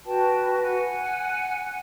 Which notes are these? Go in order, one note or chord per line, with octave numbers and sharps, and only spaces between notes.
F#4 B4 G5 A5
F#5 G#5